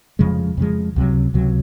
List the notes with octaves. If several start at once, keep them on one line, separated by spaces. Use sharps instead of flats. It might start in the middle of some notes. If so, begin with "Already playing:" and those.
F2 C#3 F3 G#3
F2 C#3 F3 G#3
C#2 C3 F#3
C#2 C3 F#3